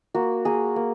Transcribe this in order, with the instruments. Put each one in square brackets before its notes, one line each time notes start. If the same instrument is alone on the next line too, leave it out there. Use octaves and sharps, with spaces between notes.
[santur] A#3 F#4
A#3 G#4
A#3